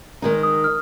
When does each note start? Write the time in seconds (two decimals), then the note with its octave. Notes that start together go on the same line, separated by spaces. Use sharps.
0.22 D#3 G#3 D#4
0.43 D#6
0.64 F6